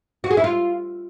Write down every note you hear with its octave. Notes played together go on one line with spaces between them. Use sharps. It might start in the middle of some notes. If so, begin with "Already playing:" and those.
F#4
G#4
E4
F4